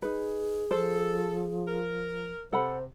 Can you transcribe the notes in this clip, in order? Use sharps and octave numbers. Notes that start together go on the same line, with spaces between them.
D#4 G#4 B4
F3 A4 C5
A#4
C3 A4 C5 F#5 B5